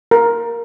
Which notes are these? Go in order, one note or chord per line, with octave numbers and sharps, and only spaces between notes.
A#4